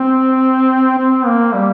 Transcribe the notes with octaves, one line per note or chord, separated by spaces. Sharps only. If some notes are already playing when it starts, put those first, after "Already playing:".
Already playing: C4
C4
A#3
G3